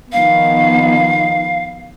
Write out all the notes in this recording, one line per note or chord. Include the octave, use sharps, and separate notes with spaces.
D#3 F3 B3 F5